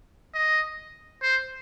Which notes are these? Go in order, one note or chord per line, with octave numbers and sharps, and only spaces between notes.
D#5
C5